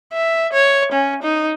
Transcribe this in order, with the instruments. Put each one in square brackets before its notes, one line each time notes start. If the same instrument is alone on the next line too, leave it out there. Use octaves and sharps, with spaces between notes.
[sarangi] E5
C#5
C#4
D#4